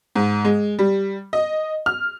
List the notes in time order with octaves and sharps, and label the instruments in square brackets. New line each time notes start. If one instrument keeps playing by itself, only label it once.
[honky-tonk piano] G#2
G#3
G3
D#5
F6